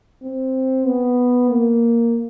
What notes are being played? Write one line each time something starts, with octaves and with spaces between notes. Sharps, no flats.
C4
B3
A#3